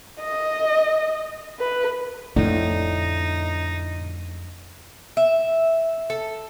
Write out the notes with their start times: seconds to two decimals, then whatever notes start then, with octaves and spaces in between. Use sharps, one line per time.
0.20 D#5
1.59 B4
2.36 F2 A2 D3 A3 D#4
5.17 E5
6.10 A4